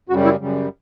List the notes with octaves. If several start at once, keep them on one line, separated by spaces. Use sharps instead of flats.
F#2 C#3 G3 F#4
E4
F#2 C#3 G3